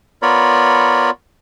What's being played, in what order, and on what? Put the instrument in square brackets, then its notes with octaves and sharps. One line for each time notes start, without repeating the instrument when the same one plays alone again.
[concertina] B3 F4 A#4 C#5 D5 B5